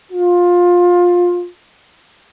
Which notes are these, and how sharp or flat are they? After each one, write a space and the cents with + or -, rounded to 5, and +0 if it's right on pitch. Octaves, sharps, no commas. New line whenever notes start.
F4 +20